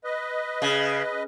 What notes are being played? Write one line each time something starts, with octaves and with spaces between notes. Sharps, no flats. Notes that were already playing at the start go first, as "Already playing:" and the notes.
B4 D#5
C#3